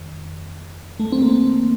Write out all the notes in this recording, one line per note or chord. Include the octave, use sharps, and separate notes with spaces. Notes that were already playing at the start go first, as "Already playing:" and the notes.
Already playing: F2 D#3
A3
C4
A#3